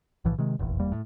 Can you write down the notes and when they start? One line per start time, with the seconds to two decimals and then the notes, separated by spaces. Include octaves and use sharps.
0.25 B1 A2 E3 F3
0.38 C3 D#3 G#3
0.59 F1 A#1 E2
0.79 F1 E2 G3 A#3
0.92 A2